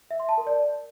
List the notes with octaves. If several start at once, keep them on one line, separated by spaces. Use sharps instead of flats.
E5
C6
A5
A#4
D5